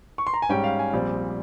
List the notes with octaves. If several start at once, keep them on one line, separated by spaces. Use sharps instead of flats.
C#6
C6
A#5
G#5
G#2 G3 C#4 G5
F5
G#5
A#1 A#2 G3 C4